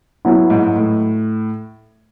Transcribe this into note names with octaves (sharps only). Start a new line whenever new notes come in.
F#3 B3 E4
G#2
G#2
A2